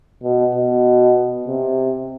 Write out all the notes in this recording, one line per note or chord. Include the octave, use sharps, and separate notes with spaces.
B2
B2
C3